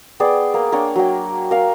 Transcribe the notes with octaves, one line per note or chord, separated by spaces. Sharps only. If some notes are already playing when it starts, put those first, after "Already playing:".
B3 G#4 D5 G5
A#3
A#3 D4 C#5 G5
F#3 G5
A#4 F5